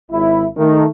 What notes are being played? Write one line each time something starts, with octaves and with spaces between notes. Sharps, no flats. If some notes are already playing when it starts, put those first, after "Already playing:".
G#1 E4
D#3 A3